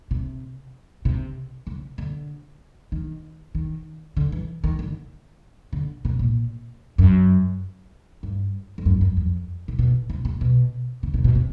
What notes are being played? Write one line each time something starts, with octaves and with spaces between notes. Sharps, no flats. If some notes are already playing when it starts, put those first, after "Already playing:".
C3
C3
C#3
D3
D#3
D#3
D3
E3
D#3
D3
D3
C3
A#2
F#2
G2
F2
F#2
F#2
F2
C3
B2
C3
C3
B2
C#3
C3
B2
C3